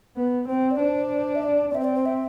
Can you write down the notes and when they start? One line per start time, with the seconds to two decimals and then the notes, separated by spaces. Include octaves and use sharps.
0.16 B3
0.48 C4 C5
0.71 D5
0.79 D4 C5
1.35 E5
1.44 D5
1.70 D5
1.75 C4 E5
1.80 C5
1.84 D5
1.95 C5
2.06 E5